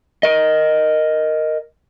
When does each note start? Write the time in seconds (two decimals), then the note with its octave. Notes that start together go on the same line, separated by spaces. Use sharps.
0.23 A#4 D#5